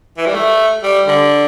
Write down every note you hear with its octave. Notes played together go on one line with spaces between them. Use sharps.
E3
G3
A3
G3
D3